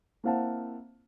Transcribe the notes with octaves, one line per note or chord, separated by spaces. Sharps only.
A#3 C4 E4 F5 F#5 A5